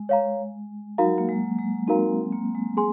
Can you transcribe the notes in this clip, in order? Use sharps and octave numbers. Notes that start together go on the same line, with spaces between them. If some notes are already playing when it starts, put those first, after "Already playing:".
Already playing: G#3
C#5 F5 A#5
F#3 D#4 F#4 A#4 F5 A#5
A#3
G#3
G#3
C4 D#4 F#4 A#4 F5 A#5
A#3
G#3
G#4 G#5 C6